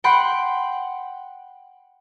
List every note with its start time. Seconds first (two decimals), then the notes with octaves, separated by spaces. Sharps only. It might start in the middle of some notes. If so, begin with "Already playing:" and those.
0.04 F#5 G5 B5 C6